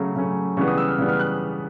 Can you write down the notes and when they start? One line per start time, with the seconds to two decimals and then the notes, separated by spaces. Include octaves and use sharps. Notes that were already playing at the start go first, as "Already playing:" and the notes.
Already playing: C#3 F#3 A3 C#4
0.15 C#3 F#3 A3 C#4
0.57 C#3 E3 G3 B3 C#6
0.68 D#6
0.78 E6
0.88 F6
0.98 C#3 E3 G3 B3
1.09 F6
1.20 F#6